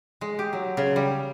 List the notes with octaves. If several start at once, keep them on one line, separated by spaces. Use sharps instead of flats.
G#3
G4
F#3
C#3
G3